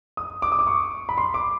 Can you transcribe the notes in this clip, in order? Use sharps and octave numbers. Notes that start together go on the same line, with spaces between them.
D#6
D6
D#6
D6
C#6
B5
C6
D6